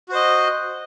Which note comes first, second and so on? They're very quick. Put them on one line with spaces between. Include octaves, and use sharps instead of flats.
F#4 C5 D#5